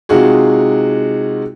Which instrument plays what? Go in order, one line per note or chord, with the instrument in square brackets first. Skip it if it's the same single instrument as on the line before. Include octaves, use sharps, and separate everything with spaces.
[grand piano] C3 G#3 D#4 F4 F#4 G#4